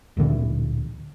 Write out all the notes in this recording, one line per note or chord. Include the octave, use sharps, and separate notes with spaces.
D1 A#2 D3 E3